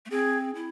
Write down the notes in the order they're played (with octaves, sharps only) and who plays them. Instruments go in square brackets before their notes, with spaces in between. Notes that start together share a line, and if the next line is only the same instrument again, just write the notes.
[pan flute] A3
[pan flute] C4 [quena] G#4
[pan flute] E4